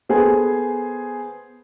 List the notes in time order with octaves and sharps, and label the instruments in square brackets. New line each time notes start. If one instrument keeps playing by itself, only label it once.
[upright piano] B3 G#4 A4 C5 G#5